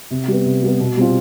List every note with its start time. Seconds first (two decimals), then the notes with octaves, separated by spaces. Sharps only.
0.11 C3
0.28 G3 B3
0.46 C3
0.63 G3 B3
0.80 B2
0.97 G3 C4 F4